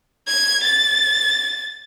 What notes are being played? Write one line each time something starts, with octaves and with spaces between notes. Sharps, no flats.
G#6
A6